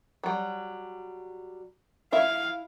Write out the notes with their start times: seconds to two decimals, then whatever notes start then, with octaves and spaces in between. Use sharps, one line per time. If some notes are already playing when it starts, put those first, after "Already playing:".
0.24 F#3 G3
2.12 E4 E5 F5